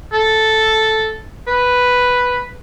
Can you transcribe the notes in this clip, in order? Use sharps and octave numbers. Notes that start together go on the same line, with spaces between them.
A4
B4